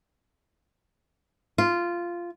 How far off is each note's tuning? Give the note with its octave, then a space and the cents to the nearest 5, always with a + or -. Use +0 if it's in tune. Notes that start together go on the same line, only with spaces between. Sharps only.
F4 -10